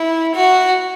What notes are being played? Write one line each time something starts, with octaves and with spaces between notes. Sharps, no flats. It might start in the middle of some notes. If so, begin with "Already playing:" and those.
Already playing: E4
F#4